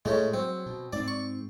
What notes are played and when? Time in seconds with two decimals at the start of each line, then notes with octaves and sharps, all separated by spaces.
0.05 A2 G#3 A3 C#4
0.34 F#3 C4
0.66 B2
0.93 G#2 C4 D5
1.08 C#6